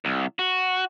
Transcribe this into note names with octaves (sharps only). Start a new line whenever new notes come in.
C2
F#4